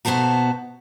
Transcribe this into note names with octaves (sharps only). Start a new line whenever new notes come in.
D#2 B2 B3 C5 A5 A#5